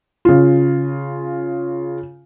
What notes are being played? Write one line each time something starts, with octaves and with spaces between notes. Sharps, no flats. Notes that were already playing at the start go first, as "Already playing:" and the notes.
C#3 F4